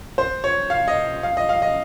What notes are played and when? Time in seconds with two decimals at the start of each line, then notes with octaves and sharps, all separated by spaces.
0.18 C5
0.44 C#5
0.70 F5
0.88 D#5
1.23 F5
1.37 D#5
1.49 F5
1.62 D#5